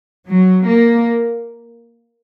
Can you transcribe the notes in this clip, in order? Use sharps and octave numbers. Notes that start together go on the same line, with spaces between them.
F#3
A#3